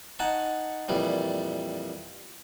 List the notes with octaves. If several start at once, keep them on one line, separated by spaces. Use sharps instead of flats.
D#4 F#5 G#5 A5 C#6
F2 A#2 E3 F3 G3